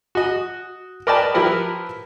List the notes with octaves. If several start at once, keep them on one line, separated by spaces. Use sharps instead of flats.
F#4 D#5
A#4 B4 D5 D#5 G5 A5
F3 E4 G4 A#4 B4